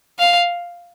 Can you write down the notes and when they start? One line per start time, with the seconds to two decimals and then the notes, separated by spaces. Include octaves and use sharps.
0.19 F5